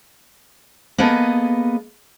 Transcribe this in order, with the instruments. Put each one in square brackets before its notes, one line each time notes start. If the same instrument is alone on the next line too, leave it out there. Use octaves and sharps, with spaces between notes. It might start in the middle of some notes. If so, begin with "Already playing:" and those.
[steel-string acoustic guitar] A#3 B3 G#4 A4 B4 D#5